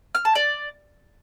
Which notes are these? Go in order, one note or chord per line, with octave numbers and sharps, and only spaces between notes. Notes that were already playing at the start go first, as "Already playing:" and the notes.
F6
A5
D5